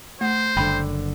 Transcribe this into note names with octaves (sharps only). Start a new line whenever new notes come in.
A3 C5
F#1 D3 G3 G5 B5